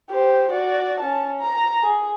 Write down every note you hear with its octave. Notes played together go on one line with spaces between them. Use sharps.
G4 C5
F#4 D5
C#4 A5
A#5
G#4